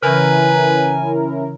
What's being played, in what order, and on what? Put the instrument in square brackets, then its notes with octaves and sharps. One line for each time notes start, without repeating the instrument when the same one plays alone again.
[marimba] C#3 E3 [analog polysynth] C#4 E4 A#4 [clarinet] B4 [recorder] G#5